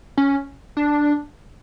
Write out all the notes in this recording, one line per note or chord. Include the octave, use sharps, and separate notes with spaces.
C#4
D4